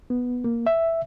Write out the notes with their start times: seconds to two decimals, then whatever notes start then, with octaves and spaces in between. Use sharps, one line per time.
0.10 B3
0.44 A#3
0.67 E5